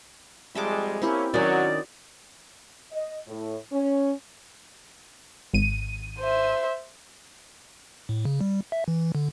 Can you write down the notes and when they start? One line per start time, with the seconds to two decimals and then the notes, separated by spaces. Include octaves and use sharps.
0.55 F2 G3 G#3 E5 A5 D6
1.02 A#3 C4 C#4 E4 G4
1.34 D#3 F#3 C#4 F#4 D5
2.92 D#5
3.27 A2
3.71 C#4
5.54 G#1 D#7
6.19 C5 E5
8.09 A2
8.25 C#3
8.41 G3
8.72 E5
8.88 E3
9.15 D3